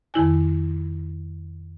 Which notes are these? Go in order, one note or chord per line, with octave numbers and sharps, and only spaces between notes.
F2 D#3 E4 G#5